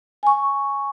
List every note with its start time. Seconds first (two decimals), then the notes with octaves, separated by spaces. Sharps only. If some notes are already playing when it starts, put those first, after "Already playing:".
0.23 G#5 C#6